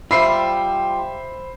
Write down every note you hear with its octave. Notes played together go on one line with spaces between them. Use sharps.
G3 F4 G4 C5 E5 B5 C7